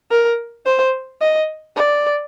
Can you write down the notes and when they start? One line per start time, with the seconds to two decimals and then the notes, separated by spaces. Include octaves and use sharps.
0.11 A#4
0.66 C5
1.21 D#5
1.76 D5